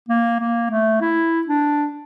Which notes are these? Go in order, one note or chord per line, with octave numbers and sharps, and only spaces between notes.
A#3
A#3
A3
E4
D4